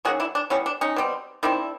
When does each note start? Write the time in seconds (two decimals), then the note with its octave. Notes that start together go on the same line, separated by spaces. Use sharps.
0.05 D#3 F#3 A#3 C#4 F#4 G#4
0.20 D4 E4
0.35 D4
0.50 E3 G3 B3 C#4
0.66 D4
0.81 C#4 D#4
0.96 B2 G3 C4
1.43 D#3 G3 C4 D4 E4